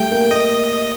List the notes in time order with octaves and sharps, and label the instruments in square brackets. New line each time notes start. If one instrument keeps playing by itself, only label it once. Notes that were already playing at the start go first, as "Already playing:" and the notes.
Already playing: [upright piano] G3 A3 [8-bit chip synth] G5
[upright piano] A#3
[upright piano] A#3 [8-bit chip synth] D#5